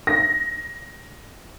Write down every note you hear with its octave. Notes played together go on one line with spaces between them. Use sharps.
A#6